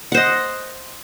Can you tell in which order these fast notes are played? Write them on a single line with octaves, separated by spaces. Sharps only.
F#5 C5 D#5